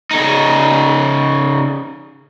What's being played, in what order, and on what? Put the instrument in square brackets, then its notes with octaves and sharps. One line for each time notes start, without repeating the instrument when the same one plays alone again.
[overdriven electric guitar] C#3 D#4